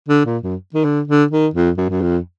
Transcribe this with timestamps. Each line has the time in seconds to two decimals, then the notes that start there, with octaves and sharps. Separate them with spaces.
0.08 D3
0.26 A#2
0.43 F#2
0.74 D#3
0.84 D3
1.08 D3
1.31 D#3
1.54 F2
1.78 F#2
1.90 F#2
2.01 F2